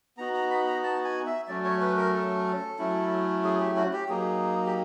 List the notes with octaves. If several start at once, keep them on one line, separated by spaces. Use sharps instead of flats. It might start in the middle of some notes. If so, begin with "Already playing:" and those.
B3 D#4 F#4 A#5
A#5
B5
A#5
A5
G#5
E5
F#3 A3 C#4 D5
C#5
B4
A#4
A4
F#3 A3 C#4 E4
G#4
G4
F#4
G4
F#3 A#3 D#4 G#4
G4